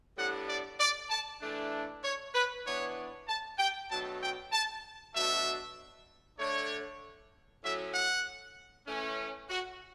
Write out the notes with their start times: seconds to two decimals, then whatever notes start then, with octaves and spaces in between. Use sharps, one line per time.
0.17 A2 G3 B3 D4 F#5
0.48 D5
0.79 D5
1.10 A5
1.41 E3 A3 D4
2.03 C#5
2.34 B4
2.66 E3 B3 D4 C#5
3.28 A5
3.59 G5
3.90 B2 F#3 A3 D4 A5
4.21 G5
4.52 A5
5.14 B2 F#3 A3 D4 E5
6.38 D3 A3 D4 C#5
7.63 A2 F#3 C#4 E5
7.94 F#5
8.87 E3 A3 C#4
9.49 F#4